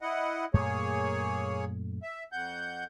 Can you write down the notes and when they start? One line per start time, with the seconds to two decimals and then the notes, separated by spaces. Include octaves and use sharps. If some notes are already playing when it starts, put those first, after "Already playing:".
0.01 E4 D#5 F#5
0.54 F#2 A#2 A3 A#3 G#4 C#5
2.03 E5
2.32 F2 F#5 G6